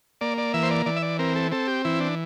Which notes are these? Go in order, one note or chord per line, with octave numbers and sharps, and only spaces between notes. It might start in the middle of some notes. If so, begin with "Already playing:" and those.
A#3 D5
D5
E3 E5
C5
D5
E3 D5
E5
D5
C4 A#4
A4
C4 A4
G4
E3 E4
D4